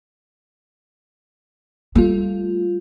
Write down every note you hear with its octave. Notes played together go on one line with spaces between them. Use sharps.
G3 A3 F4